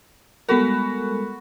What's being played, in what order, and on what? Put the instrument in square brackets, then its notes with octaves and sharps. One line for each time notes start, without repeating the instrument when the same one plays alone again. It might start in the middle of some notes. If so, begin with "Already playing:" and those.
[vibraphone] G3 G#3 [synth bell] B3 A4 A#4 [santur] F#4 B5